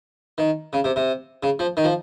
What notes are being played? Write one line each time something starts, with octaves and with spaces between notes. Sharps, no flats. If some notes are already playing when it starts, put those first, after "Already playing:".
D#3
C#3
C3
C3
C#3
F3
D#3
F3